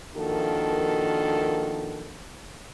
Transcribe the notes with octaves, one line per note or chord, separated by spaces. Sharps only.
D#3 F3 A#3 D4 F#4 A4